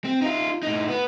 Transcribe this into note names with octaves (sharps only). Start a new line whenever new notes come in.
C4
D#4 F4
A2 D#4
B3